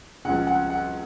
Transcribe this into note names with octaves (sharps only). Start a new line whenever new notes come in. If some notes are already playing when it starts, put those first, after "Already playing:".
C#2 C#3 F3 F#5
F#5
F#5